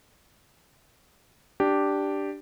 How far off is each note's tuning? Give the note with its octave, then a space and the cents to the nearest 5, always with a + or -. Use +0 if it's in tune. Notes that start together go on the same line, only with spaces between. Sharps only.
D4 +0 G4 -5